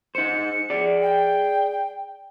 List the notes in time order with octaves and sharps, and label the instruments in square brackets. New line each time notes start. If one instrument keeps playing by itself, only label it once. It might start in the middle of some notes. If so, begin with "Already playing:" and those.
[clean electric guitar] D#4 C5 [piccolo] C#7
[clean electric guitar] G#4 D5
[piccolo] G5